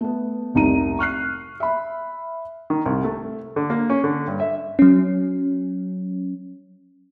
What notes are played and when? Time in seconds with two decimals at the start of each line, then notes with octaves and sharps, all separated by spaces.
0.01 A3 B3
0.54 F1 C2 D#4 A#5 D#7
0.99 C#6 F6 F#6 C7
1.60 E5 B5
2.70 D#3
2.86 C2
3.04 A3
3.56 D3
3.70 A#3
3.90 C#4
4.04 D3
4.27 G2
4.40 E5
4.79 F#3 C#4